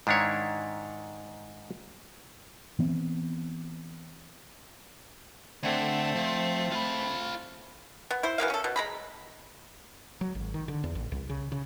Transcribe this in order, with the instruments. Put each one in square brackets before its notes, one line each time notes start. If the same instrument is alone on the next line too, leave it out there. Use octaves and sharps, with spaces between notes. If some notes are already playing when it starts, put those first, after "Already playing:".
[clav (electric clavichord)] G#2 D#3 D4 E4 C#5
[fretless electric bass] E3 B3 C4
[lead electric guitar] D3 [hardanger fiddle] A3 C4
[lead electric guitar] F3
F4 B5
[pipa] B3
E4 C5
E3 F#3 A#3 F5
C#4 A4
B2
G#3 A#5 B5
[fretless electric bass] F#3
G#1
D#3
D3
E2
A1
C2
C#3
C#3